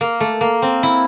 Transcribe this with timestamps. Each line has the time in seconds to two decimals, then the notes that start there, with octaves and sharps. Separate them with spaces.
0.01 A#3
0.20 A3
0.41 A#3
0.62 C4
0.83 E4